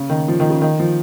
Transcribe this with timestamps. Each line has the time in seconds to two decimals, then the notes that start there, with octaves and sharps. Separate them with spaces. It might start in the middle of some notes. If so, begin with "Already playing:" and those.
Already playing: C#3
0.10 D#3
0.28 F3
0.40 D#3
0.50 C#3
0.62 D#3
0.79 F3